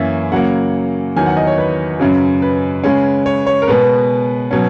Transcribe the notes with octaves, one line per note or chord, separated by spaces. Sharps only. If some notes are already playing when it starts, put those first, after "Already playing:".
Already playing: F#2 E3 A#3 C#4 E5
C#3 F#3 A#3 F#5
E2 D#3 F#3 G#5
F#5
D#5
C#5
B4
F#2 C#3 F#3
B4
C#3 G#3 C#4
C#5
C#5
A#4
B2 G#3 B3 B4
B2 F#3 C#4